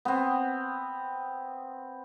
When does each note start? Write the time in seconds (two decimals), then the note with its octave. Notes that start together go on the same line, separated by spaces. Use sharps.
0.05 B3 C4